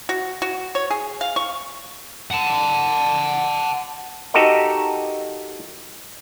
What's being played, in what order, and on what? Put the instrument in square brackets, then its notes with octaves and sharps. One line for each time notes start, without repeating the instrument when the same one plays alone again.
[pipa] F#4
F#4
C#5
G#4
F5
C#6
[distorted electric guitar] F#5 A5
[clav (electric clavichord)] D#4 F#4 G4 A4 A#4 D#5